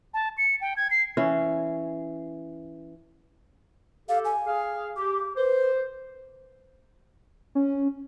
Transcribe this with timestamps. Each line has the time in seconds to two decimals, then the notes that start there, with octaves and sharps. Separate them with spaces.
0.14 A5
0.38 C#7
0.61 G5
0.77 G#6
0.91 C7
1.17 E3 C#4
4.09 G4 A4 F5
4.25 G#5
4.47 G#4 F5
4.96 G4 D6
5.37 B4 C5
7.55 C#4